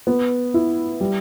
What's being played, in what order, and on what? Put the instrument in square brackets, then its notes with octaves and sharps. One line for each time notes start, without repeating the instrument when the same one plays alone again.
[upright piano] B3
E4
G3